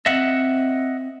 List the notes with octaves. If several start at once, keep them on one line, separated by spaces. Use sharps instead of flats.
C4 D#5 E5 F#5